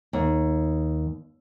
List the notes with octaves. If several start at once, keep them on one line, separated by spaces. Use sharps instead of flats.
D#2